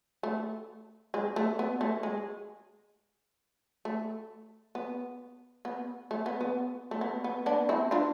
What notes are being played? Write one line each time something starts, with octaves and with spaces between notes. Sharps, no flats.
A3
G#3
A3
B3
A3
G#3
A3
B3
B3
A3
B3
B3
A3
B3
B3
B3 D4
C4 E4
D4 F4